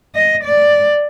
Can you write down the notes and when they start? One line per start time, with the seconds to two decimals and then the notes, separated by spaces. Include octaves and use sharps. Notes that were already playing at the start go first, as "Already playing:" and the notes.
0.15 D#5
0.44 D5